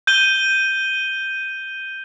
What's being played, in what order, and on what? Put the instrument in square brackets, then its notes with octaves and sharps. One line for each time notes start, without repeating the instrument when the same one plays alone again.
[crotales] G6 D#7 G7